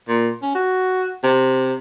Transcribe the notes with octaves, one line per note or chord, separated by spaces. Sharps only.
A#2
C#4
F#4
C3